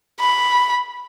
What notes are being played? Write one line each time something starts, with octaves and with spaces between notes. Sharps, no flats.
B5